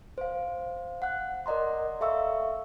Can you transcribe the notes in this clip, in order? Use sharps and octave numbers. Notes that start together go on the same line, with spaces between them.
C5 F5
F#5 F#6
A#4 D5 D#5 A#5 C6
A4 E5 F5 C#6 E6